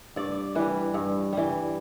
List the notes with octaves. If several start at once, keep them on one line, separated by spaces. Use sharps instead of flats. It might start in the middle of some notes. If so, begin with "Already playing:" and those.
G2 D5
E3 G3 B4
G2
E3 G3